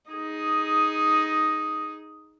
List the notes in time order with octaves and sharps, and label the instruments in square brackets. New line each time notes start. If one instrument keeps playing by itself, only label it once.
[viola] D#4 G#4